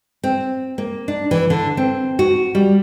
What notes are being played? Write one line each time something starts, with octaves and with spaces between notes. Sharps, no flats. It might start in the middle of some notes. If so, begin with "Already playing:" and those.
C4
A#3
D4
E3
D3
C4
F#4
G3